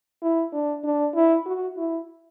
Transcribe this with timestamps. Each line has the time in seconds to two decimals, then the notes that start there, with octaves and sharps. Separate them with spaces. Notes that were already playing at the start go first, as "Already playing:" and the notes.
0.22 E4
0.53 D4
0.84 D4
1.15 E4
1.46 F#4
1.77 E4